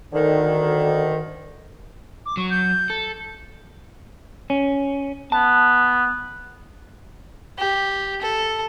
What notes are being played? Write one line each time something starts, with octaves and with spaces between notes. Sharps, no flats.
D2 D3 D#3
D6
F#3 C#6
G6
A4
C#4
B3 A5
G4
A4